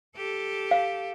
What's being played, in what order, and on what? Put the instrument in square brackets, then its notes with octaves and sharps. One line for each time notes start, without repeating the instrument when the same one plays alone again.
[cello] G4 A4
[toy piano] F5